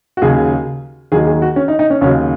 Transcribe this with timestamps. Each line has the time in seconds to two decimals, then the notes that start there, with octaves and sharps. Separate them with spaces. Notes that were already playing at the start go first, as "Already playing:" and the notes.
0.17 F#4
0.22 D#2 C#3 F#3 G#4
1.12 D#2 D#3 F#3 G#4
1.26 G#4
1.42 F#4
1.56 C#4
1.68 D#4
1.79 D#4
1.90 C#4
2.01 D#2 C#3 F#3 C#4